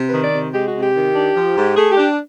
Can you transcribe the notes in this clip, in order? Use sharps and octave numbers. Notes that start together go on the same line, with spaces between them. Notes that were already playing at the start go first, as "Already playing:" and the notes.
Already playing: C3
B4
D#3
D5
C3
G#3 G4
F#4
C3
G4
D#3
D4
F3
G#2
A3 G#4
G4
D4